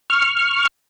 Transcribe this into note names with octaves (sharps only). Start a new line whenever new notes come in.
C#6 F6